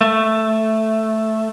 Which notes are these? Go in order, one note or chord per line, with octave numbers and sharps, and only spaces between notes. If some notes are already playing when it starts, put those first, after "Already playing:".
A3